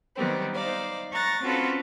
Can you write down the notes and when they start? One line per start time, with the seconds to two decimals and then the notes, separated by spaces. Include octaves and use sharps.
0.16 D#3 F#3 G3 B3 C4
0.55 D#4 C5 D5 F5
1.11 A#5 C#6 F#6 A6 A#6
1.44 C4 C#4 F4 F#4 A4 B4